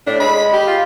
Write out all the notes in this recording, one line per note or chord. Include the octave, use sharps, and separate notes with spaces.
A2 D4
G#3 B5
G4
F4